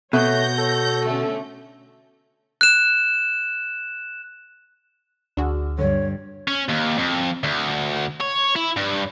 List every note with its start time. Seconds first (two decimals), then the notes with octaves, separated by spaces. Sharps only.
0.13 B2 A3 C#5 G6 A#6
0.58 A4
1.04 D3 A3 C#4
2.61 F#6 E7
5.37 D2 D4 F#4 G#4
5.79 G2 D3 C#5
6.48 C#4
6.69 D#2
6.98 F2
7.43 D2
8.21 C#5
8.56 E4
8.76 G2